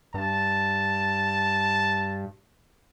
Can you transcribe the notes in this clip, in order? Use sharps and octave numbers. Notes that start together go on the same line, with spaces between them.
G2 A5